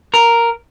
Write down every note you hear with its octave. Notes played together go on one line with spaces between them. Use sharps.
A#4